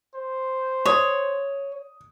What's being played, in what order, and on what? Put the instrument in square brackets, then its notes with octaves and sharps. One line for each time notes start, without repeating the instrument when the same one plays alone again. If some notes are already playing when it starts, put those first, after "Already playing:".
[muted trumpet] C5
[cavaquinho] C#5 [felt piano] D#6